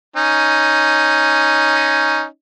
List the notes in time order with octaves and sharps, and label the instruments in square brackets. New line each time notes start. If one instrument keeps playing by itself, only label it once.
[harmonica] C#4 D#4